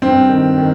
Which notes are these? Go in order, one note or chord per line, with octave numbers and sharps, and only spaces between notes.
G2 C4
D#3
D#3